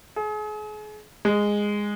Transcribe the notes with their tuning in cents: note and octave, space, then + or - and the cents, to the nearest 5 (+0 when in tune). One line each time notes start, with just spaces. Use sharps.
G#4 +35
G#3 -10